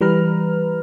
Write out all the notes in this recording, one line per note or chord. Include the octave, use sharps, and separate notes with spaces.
E3 G3 B4 A#5 F6